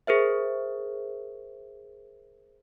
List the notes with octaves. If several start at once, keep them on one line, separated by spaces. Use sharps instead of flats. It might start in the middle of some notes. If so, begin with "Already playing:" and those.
G#4 A#4 C5 E5